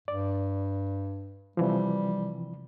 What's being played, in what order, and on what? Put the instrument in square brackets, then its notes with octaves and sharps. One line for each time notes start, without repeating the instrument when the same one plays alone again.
[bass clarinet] G2 [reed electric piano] D5
[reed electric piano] C3 E3 F3 [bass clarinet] G3